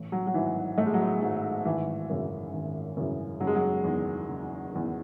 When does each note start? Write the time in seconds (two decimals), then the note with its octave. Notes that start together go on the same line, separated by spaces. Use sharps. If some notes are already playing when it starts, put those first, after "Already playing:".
Already playing: A1
0.12 F#3
0.27 F#3
0.34 G#2 D#3 E3
0.77 A1 A3
0.86 G#3
0.94 F#3
1.02 G#3
1.22 G#2 D#3 F#3
1.65 G#1 E3
2.09 F#2 C#3 E3
2.53 G#1
2.97 F#2 C#3 E3
3.40 F#1 F#3
3.47 G#3
3.55 F#3
3.84 E2 D#3
4.28 F#1
4.71 E2 D#3